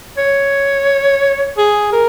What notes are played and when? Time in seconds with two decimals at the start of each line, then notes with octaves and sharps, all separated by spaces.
0.18 C#5
1.58 G#4
1.93 A#4